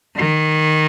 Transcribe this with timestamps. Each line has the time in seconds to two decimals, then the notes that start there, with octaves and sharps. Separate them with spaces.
0.16 D#3